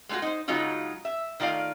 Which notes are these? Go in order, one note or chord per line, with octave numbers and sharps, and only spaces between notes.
G#3 A3 C4 F4 F#4
D#4 C5
C#3 F#3 G#3 D#4 F4 F#4
E5
D#3 A3 F4 D5 F5